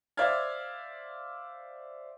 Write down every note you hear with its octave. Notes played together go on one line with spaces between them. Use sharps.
C5 D5 E5 F5 F6 G#6